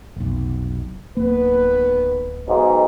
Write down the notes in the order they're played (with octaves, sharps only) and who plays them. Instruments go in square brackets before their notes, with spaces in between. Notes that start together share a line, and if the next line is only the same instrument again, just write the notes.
[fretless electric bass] F1 B1
[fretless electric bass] D1 A#3 [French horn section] D#3 B3 B4
[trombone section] B1 G#2 D#4